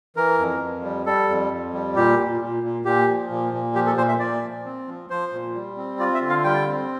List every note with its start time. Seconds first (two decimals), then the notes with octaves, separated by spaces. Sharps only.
0.16 E3 A#4
0.38 F2
0.61 F2
0.83 G3
1.06 G3 A4
1.28 F2
1.51 F2
1.74 G3
1.96 A#2 G4
2.18 A#2
2.41 A#2
2.63 A#2
2.85 A#2 G4
3.08 F3
3.30 A#2
3.53 A#2
3.75 F3 G4
3.87 A4
3.97 A#2 C5
4.09 E5
4.20 A#2 D5
4.42 F3
4.65 C4
4.88 F3
5.10 F3 C5
5.32 A#2
5.55 G3
5.77 C4
5.99 F4 D5
6.14 E5
6.22 D3
6.30 F5
6.44 G3 G5
6.67 C4